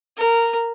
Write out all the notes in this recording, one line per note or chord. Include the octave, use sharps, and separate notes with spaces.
A#4